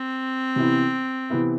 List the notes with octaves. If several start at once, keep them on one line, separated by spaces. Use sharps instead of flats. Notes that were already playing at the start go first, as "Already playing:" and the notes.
Already playing: C4
C3 E3 B3 E4
C3 E3 B3 E4